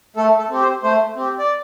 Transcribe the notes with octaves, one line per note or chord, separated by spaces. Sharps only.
A3 A4
A4
C4 G4
C5
A3 C5
C4 G4
D5